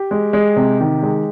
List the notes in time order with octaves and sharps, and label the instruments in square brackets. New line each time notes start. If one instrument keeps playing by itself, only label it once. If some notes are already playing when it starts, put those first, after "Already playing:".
Already playing: [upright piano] G4
G#3
G#3
C3
D#3
G#3